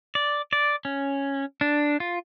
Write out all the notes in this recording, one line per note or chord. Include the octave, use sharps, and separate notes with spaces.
D5
D5
C#4
D4
F4